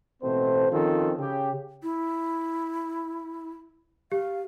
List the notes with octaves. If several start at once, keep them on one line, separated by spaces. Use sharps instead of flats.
A1 B2 A3 C4 C5
D#3 F3 C4 C#4 F4 A4
C#3 G4
E4
G4 F5